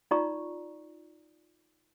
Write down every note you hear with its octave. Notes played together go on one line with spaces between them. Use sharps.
D#4 F4 D5 A#5 C#6